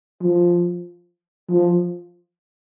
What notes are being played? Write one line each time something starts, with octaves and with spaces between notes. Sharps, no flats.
F3
F3